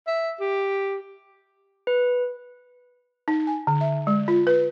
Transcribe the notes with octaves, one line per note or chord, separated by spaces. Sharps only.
E5
G4
B4
D#4
G#5
D3
E5
G#3
F4
B4